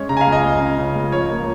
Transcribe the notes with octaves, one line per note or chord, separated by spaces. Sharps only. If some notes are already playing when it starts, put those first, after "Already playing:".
Already playing: G#3 C#4 C#5
C#3 A#5
G#5
F5
C#2
D#5
G#3
C#4
C#3
C#2
F3 C#5
A#3